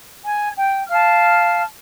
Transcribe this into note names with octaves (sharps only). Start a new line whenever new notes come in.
G#5
G5
F5 A5 F6